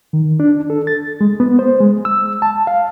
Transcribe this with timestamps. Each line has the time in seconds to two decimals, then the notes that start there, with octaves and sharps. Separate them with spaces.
0.13 D#3
0.40 D4
0.70 A4
0.87 A6
1.21 G#3
1.40 B3
1.59 C5
1.80 G#3
2.05 E6
2.42 A5
2.67 F5